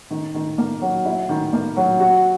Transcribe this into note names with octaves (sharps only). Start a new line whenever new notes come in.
D#3
D#3
A#3
F#3
E4
D#3
A#3
F#3
F#4